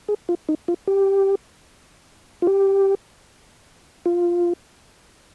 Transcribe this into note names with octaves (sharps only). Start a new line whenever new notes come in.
G#4
F4
D#4
F4
G4
F4
G4
F4